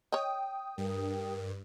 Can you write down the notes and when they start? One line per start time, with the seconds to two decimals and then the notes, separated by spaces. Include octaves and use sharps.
0.12 C#5 D#5 G5 D#6
0.78 G2 A#4